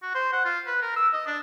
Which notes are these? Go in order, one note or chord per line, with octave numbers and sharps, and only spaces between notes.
F#4
C5
F#5
F4
B4
A#4
E6
D#5
D4